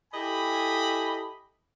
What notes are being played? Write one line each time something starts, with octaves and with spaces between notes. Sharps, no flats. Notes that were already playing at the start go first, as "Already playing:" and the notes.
E4 G4 A4 D#5 G#5 B5